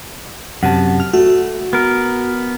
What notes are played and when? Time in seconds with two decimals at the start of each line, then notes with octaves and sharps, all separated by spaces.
0.63 F#2 C3 F#5 A5
1.00 F6
1.13 A3 F#4
1.73 B3 A#4